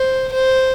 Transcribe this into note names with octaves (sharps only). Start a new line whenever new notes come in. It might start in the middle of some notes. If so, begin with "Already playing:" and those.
Already playing: C5
C5